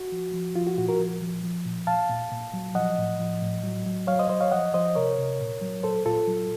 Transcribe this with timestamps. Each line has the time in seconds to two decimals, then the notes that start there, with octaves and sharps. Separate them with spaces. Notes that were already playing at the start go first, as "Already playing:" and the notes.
Already playing: F#4
0.12 F3
0.34 F3
0.56 F3 F4
0.67 F#4
0.78 A#2 F#4
0.88 F#4 A#4
1.00 F3
1.22 F3
1.44 F3
1.65 A#2
1.87 A#2 F5 A5
2.09 A#2
2.32 A#2
2.53 F#3
2.75 F3 D#5 F#5
2.98 A2
3.19 F3
3.42 A2
3.64 F#3
3.86 F#3
4.07 F#3 C#5 F5
4.19 C5 D#5
4.29 F#3 C5 D#5
4.40 C#5 F5
4.52 F3 D#5 F#5
4.74 F3 C5 D#5
4.95 C3 A#4 C#5
5.18 C3
5.40 A#2
5.61 F#3
5.83 A#2 A4 C5
6.06 A#2 F4 A4
6.28 F#3